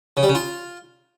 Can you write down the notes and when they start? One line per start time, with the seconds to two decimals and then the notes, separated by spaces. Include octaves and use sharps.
0.17 C#3
0.23 G3
0.29 C#3
0.35 F4